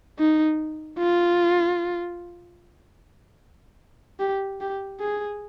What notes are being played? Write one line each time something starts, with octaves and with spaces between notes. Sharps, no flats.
D#4
F4
G4
G4
G#4